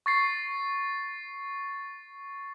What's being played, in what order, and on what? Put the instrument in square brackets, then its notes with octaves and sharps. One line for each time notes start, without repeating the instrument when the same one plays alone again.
[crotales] C#6 A6 C7